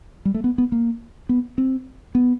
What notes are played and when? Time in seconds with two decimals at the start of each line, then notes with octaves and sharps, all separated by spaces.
0.25 G3
0.34 A3
0.44 B3
0.58 B3
0.72 A#3
1.29 B3
1.58 C4
2.15 B3